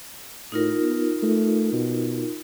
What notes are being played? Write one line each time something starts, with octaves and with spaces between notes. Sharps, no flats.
A2 D#4 F4 A#4
B3
A3
B2